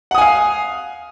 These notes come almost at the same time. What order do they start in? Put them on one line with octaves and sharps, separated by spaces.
F#5 D#6 G#5 F5